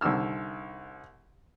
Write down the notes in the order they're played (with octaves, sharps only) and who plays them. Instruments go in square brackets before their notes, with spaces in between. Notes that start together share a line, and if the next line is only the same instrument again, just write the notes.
[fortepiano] C2 D3 D#3 E6 F6